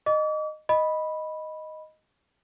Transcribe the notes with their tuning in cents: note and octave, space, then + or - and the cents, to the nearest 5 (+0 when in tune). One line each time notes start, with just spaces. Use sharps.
D#5 -15 D6 -40
D#5 +0 B5 -5